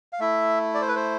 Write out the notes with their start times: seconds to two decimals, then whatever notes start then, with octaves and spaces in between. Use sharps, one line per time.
0.13 F5
0.20 A3 E4 E5
0.74 D5
0.81 C5
0.88 B4
0.96 C5